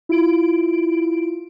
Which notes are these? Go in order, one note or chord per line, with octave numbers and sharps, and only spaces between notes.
E4 F4 D7